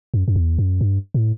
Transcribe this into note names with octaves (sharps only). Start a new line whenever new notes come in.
F#2
F#2
E2
F#2
G2
A2